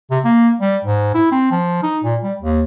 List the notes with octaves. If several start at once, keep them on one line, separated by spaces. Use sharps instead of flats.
C3
A#3
G3
G#2
E4
C4
F3
D#4
A#2
G3
D#2